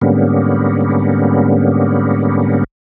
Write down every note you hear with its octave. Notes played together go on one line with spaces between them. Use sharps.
G#2 D3 G3 A#3 B3 C#4